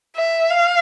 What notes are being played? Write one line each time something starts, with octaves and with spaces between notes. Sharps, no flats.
E5
F5